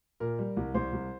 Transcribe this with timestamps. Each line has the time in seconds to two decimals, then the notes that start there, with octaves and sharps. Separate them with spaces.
0.20 A#2 A#4
0.39 G3
0.57 C2
0.74 C2 C5
0.93 C2